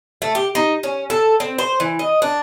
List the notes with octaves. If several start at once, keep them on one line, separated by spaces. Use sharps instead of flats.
A3
G4
D#4
C#4
A4
C4
C5
E3
D#5
D4